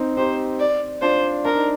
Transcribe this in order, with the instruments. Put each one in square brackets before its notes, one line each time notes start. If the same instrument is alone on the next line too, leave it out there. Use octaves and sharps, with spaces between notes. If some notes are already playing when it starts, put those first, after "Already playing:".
Already playing: [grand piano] C4 D#4
[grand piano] D#4 G4 [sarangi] C5
[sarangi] D5
[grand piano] D4 F4 [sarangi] C5
[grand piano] D4 [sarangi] A#4
[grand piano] D#4